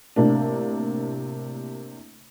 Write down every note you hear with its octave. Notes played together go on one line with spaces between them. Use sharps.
A2 C3 A#3 D4